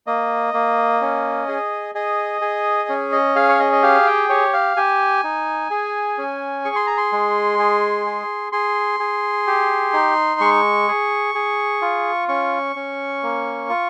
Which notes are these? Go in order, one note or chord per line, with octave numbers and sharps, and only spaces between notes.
A#3 D#5
A#3
C#4
G#4
G#4 D#5
G#4
C#4
D#5
G#4 F5
C#5
D#5
D#5
G4 F5
G5
G4 C#5
F5
G4 G#5
D#4
G#4
C#4
G#4 C#6
C6
A#5
C6
G#3
G#4
G#4
G#4 C6
G#4
G4
D#4
G#3 C#6
G#4
G#4
F4
C#4 C#6
C#4
A#3
F4